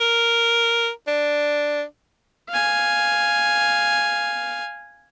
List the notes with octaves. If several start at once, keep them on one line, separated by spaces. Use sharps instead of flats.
A#4
D4
F5 G#5